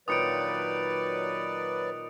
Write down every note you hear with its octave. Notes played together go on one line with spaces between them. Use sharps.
A#2 D#3 F#3 B4 D5 D#6 C#7 D7